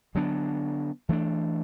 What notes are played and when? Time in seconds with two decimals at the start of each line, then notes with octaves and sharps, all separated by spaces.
0.15 D3 F#3 B3 D4
1.09 E3 A3 D4